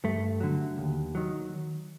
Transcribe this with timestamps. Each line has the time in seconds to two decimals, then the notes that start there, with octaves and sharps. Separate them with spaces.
0.04 G2 A3
0.40 D3 F#3
0.78 D#2
1.15 D#3 F#3